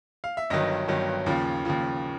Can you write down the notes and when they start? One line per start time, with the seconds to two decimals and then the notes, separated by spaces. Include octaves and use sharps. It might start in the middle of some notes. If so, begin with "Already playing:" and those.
0.24 F5
0.37 E5
0.50 G1 G2 D#3 F#3 D#5
0.88 G1 G2 D#3 F#3
1.26 D#2 C#3 F3
1.65 D#2 C#3 F3